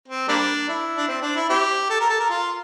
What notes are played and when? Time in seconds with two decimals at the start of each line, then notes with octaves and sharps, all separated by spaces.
0.08 C4
0.28 G3 A#3 D4
0.69 E4
0.98 D4
1.08 C4
1.22 D4
1.36 E4
1.49 C4 E4 G4
1.90 A4
2.00 A#4
2.10 A4
2.20 A#4
2.30 F4